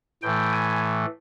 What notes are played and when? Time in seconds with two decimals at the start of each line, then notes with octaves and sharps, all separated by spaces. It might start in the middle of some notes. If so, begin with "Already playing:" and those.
0.23 A2 E3 A3 G5
0.52 G#5